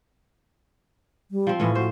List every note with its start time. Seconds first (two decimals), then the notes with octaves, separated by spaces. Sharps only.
1.31 G3
1.47 F3 C4
1.60 A2 E3 C#4
1.75 F#4 C5